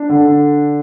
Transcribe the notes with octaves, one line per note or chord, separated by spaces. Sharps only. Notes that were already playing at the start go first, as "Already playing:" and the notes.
Already playing: D4
D3